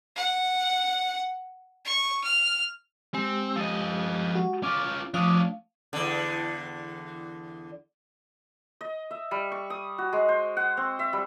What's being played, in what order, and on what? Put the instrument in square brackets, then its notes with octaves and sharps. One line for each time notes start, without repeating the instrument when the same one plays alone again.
[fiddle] F#5
C#6
F6
[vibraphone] G#3 G4 [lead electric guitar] C4
[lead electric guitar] F3 D#5
[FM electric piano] F#4
[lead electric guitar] C#4 F4 [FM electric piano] D6
[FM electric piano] F3 D6 D#6 [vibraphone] A3 F5 [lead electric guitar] C#4 D4
[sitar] E2 D3
[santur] D#5
E5
G3
C#6
D#6
F#4
G#3
C5
F#5
C4
E5
G3